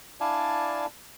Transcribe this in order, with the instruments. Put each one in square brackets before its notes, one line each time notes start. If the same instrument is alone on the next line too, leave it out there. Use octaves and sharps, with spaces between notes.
[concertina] D4 E4 D5 F5 G#5 A5